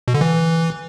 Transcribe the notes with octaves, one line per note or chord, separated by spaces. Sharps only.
B2
D3
E3